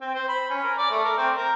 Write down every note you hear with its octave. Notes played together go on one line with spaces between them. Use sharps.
C4
C5
B5
C#4
A#4
D5
A3
A#4
C4
A#4